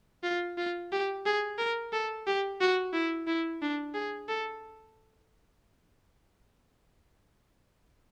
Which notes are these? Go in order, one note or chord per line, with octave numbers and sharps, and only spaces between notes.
F4
F4
G4
G#4
A#4
A4
G4
F#4
E4
E4
D4
G#4
A4